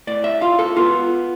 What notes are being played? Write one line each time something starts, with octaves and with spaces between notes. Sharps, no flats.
A2 D5
E5
F4 F5
A4
B3 F4